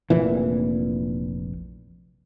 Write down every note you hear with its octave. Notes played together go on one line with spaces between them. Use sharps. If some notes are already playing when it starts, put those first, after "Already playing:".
F1 A#1 A#2 E3